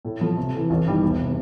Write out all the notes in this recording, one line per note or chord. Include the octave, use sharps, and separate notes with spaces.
A2
F3 A3
C3
E3 A3
A1
G2 D#3 G3
E1
C3